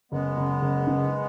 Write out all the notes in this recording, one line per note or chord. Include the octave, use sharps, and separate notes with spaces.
F#1 G#3 B3
F#1
F#1
C#3